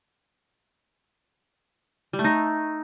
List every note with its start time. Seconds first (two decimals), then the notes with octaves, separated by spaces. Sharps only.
2.13 G3
2.19 A3
2.24 D#4